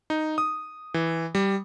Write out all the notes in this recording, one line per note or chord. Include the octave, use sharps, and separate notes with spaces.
D#4
D#6
E3
G3